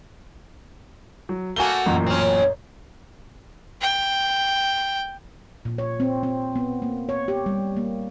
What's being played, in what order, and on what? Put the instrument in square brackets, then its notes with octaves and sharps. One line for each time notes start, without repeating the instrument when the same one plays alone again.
[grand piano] F#3
[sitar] A3 A#3 F#4 [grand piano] G#5 G7
[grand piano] A1 F#2 A#2
[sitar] C4 C#4
[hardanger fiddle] G5
[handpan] A#2
C#5
C4
C4
B3
A#3
C#5
G4
G3
A#3